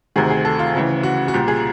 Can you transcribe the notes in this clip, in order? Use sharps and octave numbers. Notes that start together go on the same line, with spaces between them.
D2 C3 D#3 G#4
G#4
A4
F4
D2 C#3 E3
F#4
F#4
C2 A#2 G4
G#4